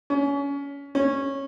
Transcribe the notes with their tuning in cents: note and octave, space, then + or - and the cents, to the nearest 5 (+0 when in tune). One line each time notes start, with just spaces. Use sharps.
C#4 +25
C#4 -15